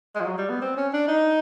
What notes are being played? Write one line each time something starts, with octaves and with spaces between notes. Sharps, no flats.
G#3
F3
F#3
G3
B3
C4
C#4
D4
D#4